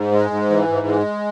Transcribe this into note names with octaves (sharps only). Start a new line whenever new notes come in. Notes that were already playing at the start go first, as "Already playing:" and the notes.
Already playing: G#2
G#3
G#2
E3
G#2
G#3